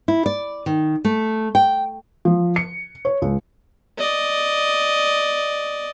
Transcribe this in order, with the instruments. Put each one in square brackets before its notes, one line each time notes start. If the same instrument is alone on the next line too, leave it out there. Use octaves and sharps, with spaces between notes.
[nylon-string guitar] E4
D5
D#3
A3
G5
[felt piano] F3
C#7
C#5
C#2
[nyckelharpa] D5 D#5